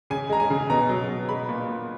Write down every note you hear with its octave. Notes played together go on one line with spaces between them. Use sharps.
C#3 G#5
G#3 A#5
G#5
C#3
B2 A#5
F#3
B2
G#3 B5
A#2
A#2